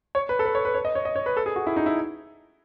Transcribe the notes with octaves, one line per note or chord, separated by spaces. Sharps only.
C#5
B4
A4
B4
C#5
B4
C#5
D#5
C#5
D#5
C#5
B4
A4
G#4
F#4
E4
D#4
E4